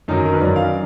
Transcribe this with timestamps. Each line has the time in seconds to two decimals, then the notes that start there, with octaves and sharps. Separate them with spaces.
0.08 F#2 D#3 F#3 D#4
0.25 A#4
0.33 B4
0.41 F#2 D#3 F#3 D5
0.56 F5